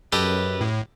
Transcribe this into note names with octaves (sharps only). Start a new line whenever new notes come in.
F#2 G4 A4 B4 D#5
A2